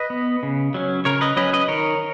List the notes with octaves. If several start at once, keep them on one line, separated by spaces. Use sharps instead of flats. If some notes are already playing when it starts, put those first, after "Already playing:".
Already playing: B4 D#5
B3
C#3
F#3 C#4
C#3 A#4 C#5
B4 D#5
F#3 C#4 B4 D#5
B4 D#5
D#3 A#4 C#5